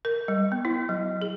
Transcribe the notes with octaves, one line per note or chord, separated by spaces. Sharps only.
A#4
G3
B3
E4
F#3
G#4